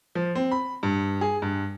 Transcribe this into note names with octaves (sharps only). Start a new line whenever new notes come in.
F3
C4
B5
G2
G#4
G2